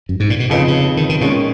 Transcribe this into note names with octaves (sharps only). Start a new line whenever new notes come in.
F#2
G#2
A#2
B2
F2 C#3 F3 B3 D#4
C#3
D#3
D#3
A#2 D#3 G#3 C#4